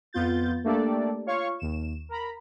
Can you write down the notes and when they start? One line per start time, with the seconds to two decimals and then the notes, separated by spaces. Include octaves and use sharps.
0.13 F2 B3 F4 G6 A6
0.64 A3 A#3 D4 G4 A4 D5
1.26 F4 C#5 F5 C#6
1.59 D#2 E7
2.09 A#4 A#5 B5